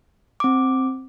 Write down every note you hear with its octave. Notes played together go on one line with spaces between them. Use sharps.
C4 D6